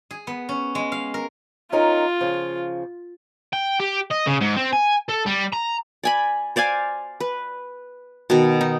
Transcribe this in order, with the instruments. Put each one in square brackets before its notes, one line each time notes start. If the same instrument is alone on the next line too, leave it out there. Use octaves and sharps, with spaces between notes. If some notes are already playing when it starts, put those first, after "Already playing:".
[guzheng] G#4
B3
C#4
G#3
F5
A#4
[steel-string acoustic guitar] C#4 D#4 A#4 [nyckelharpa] F4
[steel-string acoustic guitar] C#3 F3
[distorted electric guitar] G5
G4
D#5
C#3
G#2
C4
G#5
A4
G3
A#5
[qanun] D5 G#5 B5
C5 D5 F5 G#5
B4
B2 D#3
D#4